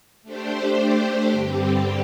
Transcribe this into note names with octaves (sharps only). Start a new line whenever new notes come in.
A3 D4 G4 C5
G2 D3 G3 C4 G4